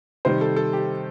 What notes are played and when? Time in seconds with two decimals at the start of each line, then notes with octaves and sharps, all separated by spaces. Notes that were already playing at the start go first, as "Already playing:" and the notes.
0.25 C3 D#3 G3 C5
0.41 A4
0.56 A4
0.73 G4